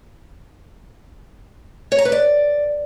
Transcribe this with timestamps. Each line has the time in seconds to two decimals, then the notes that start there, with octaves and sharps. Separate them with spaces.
1.92 C#5
1.98 A#5
2.05 B4
2.12 D5